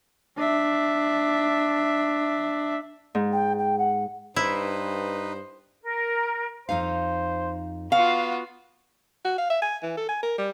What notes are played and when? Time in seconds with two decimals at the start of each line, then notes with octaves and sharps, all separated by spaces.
0.38 D4 E5
3.15 G#2
3.32 G5
3.58 G5
3.78 F#5
4.36 G2 D#4 E4 B4 C5
5.83 A#4
6.69 F2 D#4 C5 F5
7.92 B3 F4 F#4 F5
9.25 F#4
9.38 F5
9.50 E5
9.62 G#5
9.82 E3
9.97 A4
10.09 G#5
10.23 A#4
10.38 G3